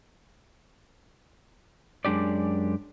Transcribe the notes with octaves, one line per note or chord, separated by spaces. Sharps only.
F#2 G#3 D4 G4 D5